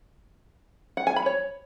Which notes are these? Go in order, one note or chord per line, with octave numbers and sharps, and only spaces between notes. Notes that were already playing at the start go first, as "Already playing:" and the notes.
F#5
G#5
B5
C#5